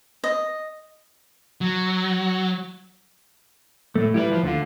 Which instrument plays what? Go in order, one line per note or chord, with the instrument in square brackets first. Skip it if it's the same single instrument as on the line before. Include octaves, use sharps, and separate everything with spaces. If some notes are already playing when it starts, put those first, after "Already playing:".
[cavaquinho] D#5
[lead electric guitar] F#3
[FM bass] A2 [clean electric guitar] A3
[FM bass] G3 [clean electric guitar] E4 G4 B4
[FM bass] F3
[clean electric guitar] D2 F4 [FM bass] D3